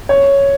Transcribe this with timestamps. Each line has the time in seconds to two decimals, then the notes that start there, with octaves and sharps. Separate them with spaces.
0.09 C#5